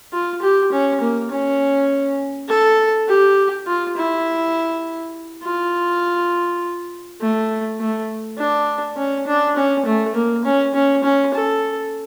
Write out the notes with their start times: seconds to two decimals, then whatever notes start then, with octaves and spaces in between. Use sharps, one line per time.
0.13 F4
0.42 G4
0.72 C#4
1.01 A#3
1.30 C#4
2.48 A4
3.08 G4
3.67 F4
3.96 E4
5.44 F4
7.21 A3
7.80 A3
8.39 D4
8.97 C#4
9.27 D4
9.57 C#4
9.86 A3
10.15 A#3
10.45 C#4
10.74 C#4
11.04 C#4
11.34 A4